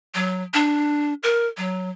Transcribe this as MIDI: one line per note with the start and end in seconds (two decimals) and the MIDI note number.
0.14 0.43 54
0.54 1.14 62
1.23 1.47 70
1.57 1.90 54